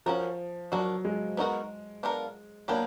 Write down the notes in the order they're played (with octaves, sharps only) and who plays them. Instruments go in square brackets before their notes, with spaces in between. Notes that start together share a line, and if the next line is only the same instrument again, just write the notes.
[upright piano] F3 [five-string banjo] C#4 F#4 A#4
[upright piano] F#3 [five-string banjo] D4 F#4 A#4
[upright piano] G#3
[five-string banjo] B3 D#4 F#4 A#4
B3 D4 F4 A#4
[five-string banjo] F#3 B3 D4 G4 [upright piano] A#3